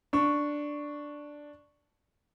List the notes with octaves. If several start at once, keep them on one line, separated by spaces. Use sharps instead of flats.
D4 C#6